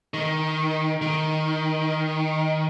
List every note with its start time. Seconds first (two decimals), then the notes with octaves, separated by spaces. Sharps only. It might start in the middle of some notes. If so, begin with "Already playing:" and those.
0.14 D#3
1.02 D#3